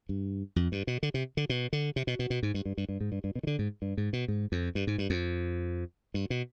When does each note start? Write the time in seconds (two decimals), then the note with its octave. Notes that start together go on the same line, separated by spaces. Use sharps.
0.09 G2
0.56 F2
0.72 G2
0.87 B2
1.03 D3
1.14 C3
1.37 D3
1.49 B2
1.73 D3
1.96 C3
2.07 B2
2.19 B2
2.30 B2
2.43 G#2
2.54 G2
2.65 G2
2.78 G2
2.89 G2
3.01 G#2
3.12 G2
3.24 G2
3.35 B2
3.43 D#3
3.47 D3
3.59 G#2
3.82 G2
3.97 G#2
4.13 B2
4.28 G#2
4.52 F2
4.75 G2
4.87 G#2
4.98 G2
5.10 F2
6.14 G2
6.30 B2